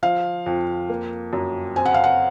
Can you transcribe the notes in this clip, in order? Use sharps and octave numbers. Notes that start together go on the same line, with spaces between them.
F3 F5
F2
A#3
F#2
C4 G#5
F#5
F5
F#5